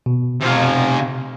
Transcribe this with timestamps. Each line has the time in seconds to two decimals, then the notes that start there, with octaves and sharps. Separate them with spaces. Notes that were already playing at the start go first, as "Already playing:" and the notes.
0.06 B2
0.41 C3 F5